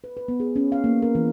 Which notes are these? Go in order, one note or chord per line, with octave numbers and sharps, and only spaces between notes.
B4
B4
B3
G#4
C#4
F5
A#3
A#4
E3